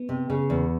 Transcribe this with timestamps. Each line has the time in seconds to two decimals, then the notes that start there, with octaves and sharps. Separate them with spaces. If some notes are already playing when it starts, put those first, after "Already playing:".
Already playing: B3
0.09 C3
0.30 C#3
0.50 E2